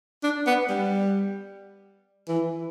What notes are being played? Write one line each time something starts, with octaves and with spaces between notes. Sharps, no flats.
D4
B3
G3
E3